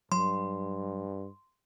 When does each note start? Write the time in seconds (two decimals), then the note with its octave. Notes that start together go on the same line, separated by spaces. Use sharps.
0.12 G2 F#3 C6